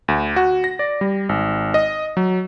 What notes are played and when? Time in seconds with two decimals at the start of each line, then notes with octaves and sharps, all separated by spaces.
0.08 D2
0.36 F#4
0.64 A#6
0.79 D5
1.01 G3
1.29 G#1
1.74 D#5
2.17 F#3